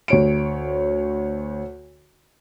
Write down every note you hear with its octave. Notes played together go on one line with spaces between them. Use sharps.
D2 C#5 D7